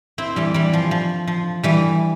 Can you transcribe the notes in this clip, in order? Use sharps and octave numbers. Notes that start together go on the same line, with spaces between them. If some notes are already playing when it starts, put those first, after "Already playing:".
C4 E4
E3 G3
E3 G3
F3
F3
F3
E3 G3